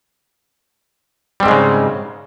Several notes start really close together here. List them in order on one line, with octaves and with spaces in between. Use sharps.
G3 C4 G#2 G#3 C#3